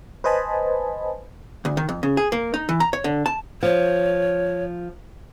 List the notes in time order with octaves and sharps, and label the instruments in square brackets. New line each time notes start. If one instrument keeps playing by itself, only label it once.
[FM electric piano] B4 C5 D#5 G#5 A5 B5
[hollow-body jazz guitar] D2
D#3
F2
C#3
G#4
A#3
D#4
E3
A#5
C#5
D3
A5
[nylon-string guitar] F3 [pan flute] C#5